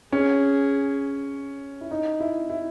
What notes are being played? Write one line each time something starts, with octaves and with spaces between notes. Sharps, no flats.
C#4 G#4
E4
D#4
E4
E4